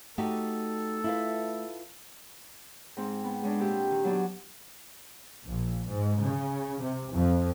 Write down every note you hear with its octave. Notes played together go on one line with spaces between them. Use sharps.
A3 D#4 F#4 G4 A4
E4 F4 B4
G#2 C4
B3
G#3 C#4 D4
A#2 C4 G4 E5
D#3
F#3 B3 D4
A#1
G#2
C#3
C3
F2